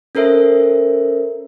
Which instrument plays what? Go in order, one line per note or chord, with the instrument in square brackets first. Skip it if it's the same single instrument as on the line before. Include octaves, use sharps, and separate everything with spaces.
[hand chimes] C#4 A4 A#4 C5 E5